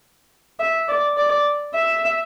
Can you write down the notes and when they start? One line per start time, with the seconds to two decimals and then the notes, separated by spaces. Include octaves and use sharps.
0.60 E5
0.88 D5
1.17 D5
1.74 E5